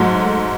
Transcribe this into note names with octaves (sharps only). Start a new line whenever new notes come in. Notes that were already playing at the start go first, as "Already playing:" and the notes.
Already playing: G#2 F#3 A3